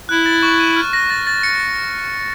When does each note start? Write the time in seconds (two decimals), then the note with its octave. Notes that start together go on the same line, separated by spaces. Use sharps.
0.09 E4 F#6
0.26 A6
0.43 C#6
0.60 D#7
0.77 F6
0.93 A#6
1.10 A6
1.27 A6
1.43 C#7